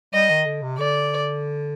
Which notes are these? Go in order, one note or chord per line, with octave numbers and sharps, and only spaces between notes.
G3 D#5
D#3
D3
C3
D3 D5